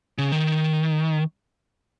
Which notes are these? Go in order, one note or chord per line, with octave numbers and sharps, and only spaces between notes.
C#3
D#3